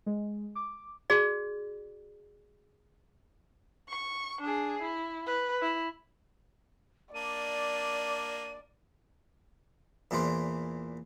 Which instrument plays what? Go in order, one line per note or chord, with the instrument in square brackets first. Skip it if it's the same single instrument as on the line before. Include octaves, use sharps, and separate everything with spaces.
[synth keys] G#3
D6
[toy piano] F#4 G#4 D5
[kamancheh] C#6
D4 G#4
E4
B4
E4
[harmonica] A#3 D4 [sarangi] D5 [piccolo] D#7
[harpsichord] E2 A#2 E3 D4 C5